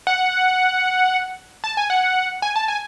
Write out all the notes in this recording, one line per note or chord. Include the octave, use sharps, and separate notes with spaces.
F#5
A5
G#5
F#5
G#5
A5
G#5